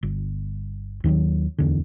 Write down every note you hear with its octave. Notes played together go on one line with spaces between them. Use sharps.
G1
D#2 D#3 E3 F#3
D1 E2 D3